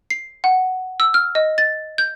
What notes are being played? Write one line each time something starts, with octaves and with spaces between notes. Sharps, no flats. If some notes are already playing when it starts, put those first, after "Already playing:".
C7
F#5
E6
F6
D#5
A6
G6